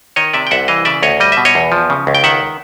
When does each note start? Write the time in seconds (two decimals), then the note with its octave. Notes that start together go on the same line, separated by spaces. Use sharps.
0.16 D#3 C#5 D#5
0.34 C3 D5 E5
0.47 G5
0.51 C2 E5 F#5
0.68 E3 D#5 F5
0.85 C#3 D5 E5
1.03 D2 C#5 D#5
1.20 G3 D#5
1.32 E5
1.37 B2
1.45 C#5 D#5
1.55 E2
1.72 F3
1.90 C#3
2.07 C#2
2.15 G5
2.24 D#3 E5 F#5